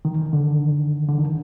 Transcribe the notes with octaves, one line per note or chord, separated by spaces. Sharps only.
D#3
D3
D3
D#3